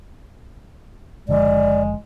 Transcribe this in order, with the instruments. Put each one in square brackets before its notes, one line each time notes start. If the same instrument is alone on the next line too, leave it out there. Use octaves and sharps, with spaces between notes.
[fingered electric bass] F#1 D3 F3 [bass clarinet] G#3 [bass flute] D5